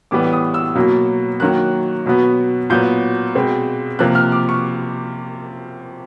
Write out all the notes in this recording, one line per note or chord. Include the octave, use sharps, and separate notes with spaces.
A2 E3 G3 B3 D6
D#6
E6
B2 F#3 A#3
D#3 F#3 A#3 F#6
B2 F#3 B3
A#2 F#3 B3 G6
B2 G#3 C4
C3 F3 A#3 F#6
F6
D6
C#6